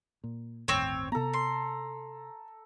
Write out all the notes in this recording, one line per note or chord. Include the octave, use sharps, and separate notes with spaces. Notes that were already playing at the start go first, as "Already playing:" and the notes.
A#2
G1 D#2 A2 C4 C#5
C3 B3 A4 A#5
C6